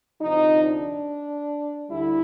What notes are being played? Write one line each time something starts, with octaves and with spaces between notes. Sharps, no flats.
D2 C3 F3 D#4
D4
D2 D3 G3 E4